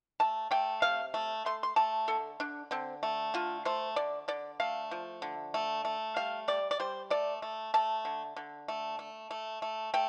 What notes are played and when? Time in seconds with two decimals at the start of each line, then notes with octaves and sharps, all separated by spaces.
0.20 A3 A5
0.51 A3 G5
0.82 C3 F5
1.14 A3
1.46 A3 C6
1.63 C6
1.76 A3 A5
2.08 D3 A4
2.40 D3 D4
2.71 D3 C4
3.03 A3
3.34 D3 F4
3.65 A3 C5
3.96 D3 D5
4.28 D3 D5
4.60 A3 F5
4.91 F3
5.22 D3
5.54 A3
5.85 A3
6.16 G3 F5
6.48 G3 D5
6.71 D5
6.80 G3 C5
7.10 A3 D5
7.42 A3
7.74 A3 A5
8.05 D3
8.37 D3
8.68 A3
8.99 A3
9.31 A3
9.62 A3
9.94 A3 G5